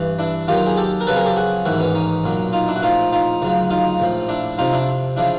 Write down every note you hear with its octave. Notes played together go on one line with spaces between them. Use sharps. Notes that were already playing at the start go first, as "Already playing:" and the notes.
Already playing: G2 E3
D4 E4
D#2 D#3 F#3 F4 G4
G#4
G4 A4
A#4
F2 C#3 F#3 A4 B4
G#4 A#4
G4 A4
F#4 G#4
A1 G#2 D#3 E4 F#4
B3 C#4
C#4 D#4
B1 A#2 F#3
D#4 F4
D4 E4
F#4
A#1 A2 F3 D#4 F4
D#4 F4
D2 C#3 F#3
D#4 F4
A#1 A2 F3
D4 E4
F2 C3 F3 D#4 F4
D4 E4
C#3 F3 D4 E4